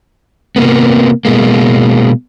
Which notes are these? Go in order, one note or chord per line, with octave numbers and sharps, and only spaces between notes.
C3 A#3 B3
B2 G#3 A#3